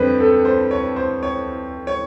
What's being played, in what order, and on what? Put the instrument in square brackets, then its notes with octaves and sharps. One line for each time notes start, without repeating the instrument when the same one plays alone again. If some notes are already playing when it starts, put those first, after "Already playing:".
Already playing: [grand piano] F2 D3 G3 B4 C5
A4
C5
C#5
C5
C#5
C#5